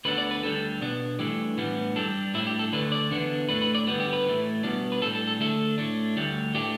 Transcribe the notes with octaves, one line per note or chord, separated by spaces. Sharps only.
D2 D3 B3 D4 B4
D5
B4
D2 D3 G3 A4
B2 B3 D4
G2 E3 A3 D4 G4
A2 E3 G3 B3 D4
G2 G3 D4 A4
A2 G3 B3 D4 E4
G4
A4
D2 D3 A3 D4 B4
D5
E2 D3 B3 D4
A2 A3 D4 B4
B4
D5
G2 D3 G3 B3 B4
G4
B4
A2 E3 A3
B2 G3 B3 D4
B4
A2 G3 D4 A4
A4
A4
D2 D3 A3 D4 A4
A2 A3 D4
D2 D3 G3
A2 A3 D4 G4